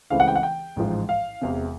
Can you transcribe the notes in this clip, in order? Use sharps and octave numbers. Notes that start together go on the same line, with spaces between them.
C#2 C#3 E3 A3 C4 F5
F#5
G5
F#5
G5
A1 G#2 F3
F5
E1 E2 C3